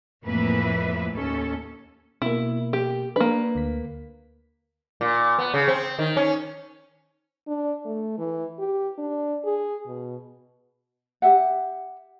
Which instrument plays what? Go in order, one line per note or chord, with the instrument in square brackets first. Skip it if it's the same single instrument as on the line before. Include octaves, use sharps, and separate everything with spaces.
[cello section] F2 A2 E3 A#3 B4 E5
D#2 C#4 A4
[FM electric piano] B2 A#3 [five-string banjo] E4
[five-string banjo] G4
[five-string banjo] A#3 B4 [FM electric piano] D4
[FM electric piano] D2 B6
[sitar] A#2
B3
C#3
C4
D#3
C#4
[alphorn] D4
A3
E3
G4
D4
G#4
B2
[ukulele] G4 E5 F#5